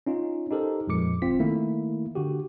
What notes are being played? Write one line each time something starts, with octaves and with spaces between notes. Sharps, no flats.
C#4 D#4 F4
D#4 G4 A4 A#4 C5
F2 A#2 F3 G#3 D6 C#7
G1 C4 F4 B6
D#3 A3 A#3 E4
D3 F#4 G4